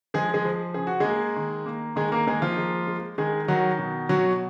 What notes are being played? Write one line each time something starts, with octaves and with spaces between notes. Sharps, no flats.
F3 G#3 G#4
G#3 G#4
F3
C#3 G#4
F#4
G#3 A#3 G#4
D#3
A#3
D#3 G#3 G#4
A#3 A#4
G#3 A#3 G#4
F3 F4
G#3
G#3
D#3 G#3 G#4
D#3 F#3 F#4
B2
B2 F#3 F#4